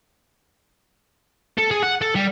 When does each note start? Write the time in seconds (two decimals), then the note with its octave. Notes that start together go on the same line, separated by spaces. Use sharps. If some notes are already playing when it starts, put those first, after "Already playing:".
1.58 A4
1.71 G#4
1.83 F#5
2.02 A4
2.15 G3